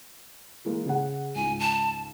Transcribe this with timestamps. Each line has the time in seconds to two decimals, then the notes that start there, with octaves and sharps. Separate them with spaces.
0.65 E3 G#3 A#3
0.85 C#3 G#4 F#5
1.35 C#2 G#2 G#5
1.60 A5